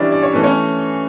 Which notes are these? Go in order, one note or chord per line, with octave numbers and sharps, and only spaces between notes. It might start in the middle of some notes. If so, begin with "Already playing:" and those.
Already playing: E3 G3 C#4 D4 E4 D5 E5
D5
C#5
E3 A3 C#4 B4
C#4 C#5